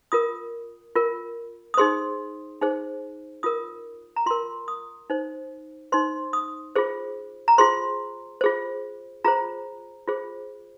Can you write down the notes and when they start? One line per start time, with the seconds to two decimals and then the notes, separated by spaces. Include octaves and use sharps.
0.12 F4 A#4 D#6
0.96 F4 A#4
1.74 D#6
1.77 D#4 G#4 C5 C6
2.61 D#4 G#4 C5
3.43 F4 A#4 D#6
4.16 A#5
4.26 F4 A#4 C6
4.68 D#6
5.10 D#4 C5
5.92 D#4 C5 C6
6.33 D#6
6.76 F4 G#4 C5
7.48 A#5
7.58 F4 G#4 C5 C6
8.41 F4 G#4 C5
9.24 F4 G#4 C5 A#5
10.08 F4 G#4 C5